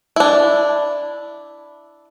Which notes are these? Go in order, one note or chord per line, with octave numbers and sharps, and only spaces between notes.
D4 E4